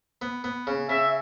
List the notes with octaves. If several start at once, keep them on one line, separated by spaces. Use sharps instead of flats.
B3
B3
C#3
C#3 E5